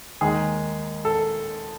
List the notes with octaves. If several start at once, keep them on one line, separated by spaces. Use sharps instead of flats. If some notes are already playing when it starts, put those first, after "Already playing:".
D#2 D#3 G#3 G#4
A4